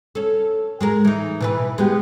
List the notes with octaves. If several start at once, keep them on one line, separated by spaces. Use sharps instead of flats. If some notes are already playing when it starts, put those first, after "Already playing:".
C#4 A4
G#3 G#4 A#4
E3 D#4
B2 E3 B4
G#3 B3 G4